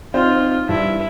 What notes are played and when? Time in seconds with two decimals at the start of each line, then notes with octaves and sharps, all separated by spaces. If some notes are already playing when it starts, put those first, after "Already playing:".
0.14 C4 D#4 F4 C5
0.69 G2 E4